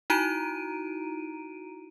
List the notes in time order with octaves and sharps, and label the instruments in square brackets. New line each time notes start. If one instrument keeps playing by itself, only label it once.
[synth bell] D#4 E4 F#4 A#5 D7 D#7